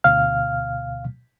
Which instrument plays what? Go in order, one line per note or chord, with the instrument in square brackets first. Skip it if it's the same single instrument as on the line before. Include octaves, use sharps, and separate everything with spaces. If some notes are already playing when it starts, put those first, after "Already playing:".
[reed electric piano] D2 B2 F5 F6